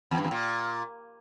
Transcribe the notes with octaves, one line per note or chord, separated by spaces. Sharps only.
E2
G2
E2
A#2